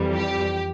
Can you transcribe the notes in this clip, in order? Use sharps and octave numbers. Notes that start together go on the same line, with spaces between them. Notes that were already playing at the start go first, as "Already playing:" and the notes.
Already playing: F2 E3 G3
G4